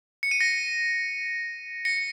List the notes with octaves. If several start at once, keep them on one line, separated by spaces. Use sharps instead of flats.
C#7
D#7
A#6 C#7
A#6 C#7